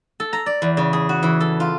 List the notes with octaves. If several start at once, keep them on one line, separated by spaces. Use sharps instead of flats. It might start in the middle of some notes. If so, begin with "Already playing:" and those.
A4
A#5
D5
E2
C#3
G#4
F#4
E3
A4
F4